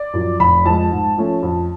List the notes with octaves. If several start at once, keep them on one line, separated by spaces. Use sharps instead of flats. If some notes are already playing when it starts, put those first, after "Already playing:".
Already playing: D5
F#2 F3
F1 B5
F2 F3 G#3 A5
G#2
F3 A3 C#4
F2